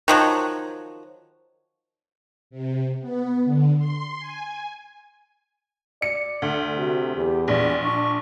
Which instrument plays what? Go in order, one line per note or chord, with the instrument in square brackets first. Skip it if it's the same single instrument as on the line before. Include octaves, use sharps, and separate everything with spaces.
[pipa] D#3 F3 F#3
[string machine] C3
B3
D3
C6
G#5
[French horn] D5 [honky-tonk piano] C#7
[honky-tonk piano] D2
[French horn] C3 [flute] F#4
[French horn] E2 [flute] G4
[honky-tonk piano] A#1 [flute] D5
[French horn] D4 [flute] C#6